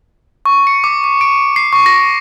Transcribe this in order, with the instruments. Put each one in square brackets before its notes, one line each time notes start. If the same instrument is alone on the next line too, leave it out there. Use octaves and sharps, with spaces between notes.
[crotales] C#6
C#7
D6
D6
D7
C7
C#6
A#6